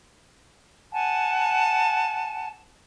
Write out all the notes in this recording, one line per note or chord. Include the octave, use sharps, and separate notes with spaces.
F#5 G#5 A5